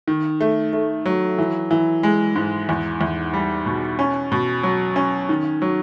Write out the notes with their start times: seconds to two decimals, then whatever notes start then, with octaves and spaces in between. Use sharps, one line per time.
0.08 D#3
0.41 A3
0.73 A3
1.06 F#3
1.38 E3
1.71 E3
2.03 G#3
2.36 G#2
2.69 E2
3.01 E2
3.34 G3
3.66 B2
3.99 C#4
4.32 B2
4.63 F#3
4.96 C#4
5.29 D#3
5.62 F#3